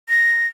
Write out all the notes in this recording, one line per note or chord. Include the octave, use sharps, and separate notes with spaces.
A#6